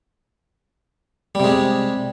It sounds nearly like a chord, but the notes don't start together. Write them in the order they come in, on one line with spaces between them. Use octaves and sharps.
G3 C3 G#3